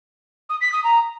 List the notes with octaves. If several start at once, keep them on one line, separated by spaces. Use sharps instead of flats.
D#6
B6
D#6
A#5